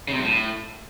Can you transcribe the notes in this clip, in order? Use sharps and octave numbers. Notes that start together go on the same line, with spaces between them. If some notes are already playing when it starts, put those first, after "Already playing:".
C#3
C3
G2
A2